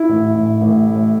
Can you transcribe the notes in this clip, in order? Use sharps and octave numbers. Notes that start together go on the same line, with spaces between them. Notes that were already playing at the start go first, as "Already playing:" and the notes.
Already playing: E4
A1
A1
A1
A2